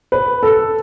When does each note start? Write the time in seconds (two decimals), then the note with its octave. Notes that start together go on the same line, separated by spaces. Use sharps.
0.12 B4
0.43 A4